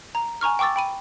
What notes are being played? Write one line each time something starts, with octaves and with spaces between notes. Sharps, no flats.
A#5
G#5 A#5 C#6 F6
G5 C#6 D6 E6 A6
G5 B5 D#7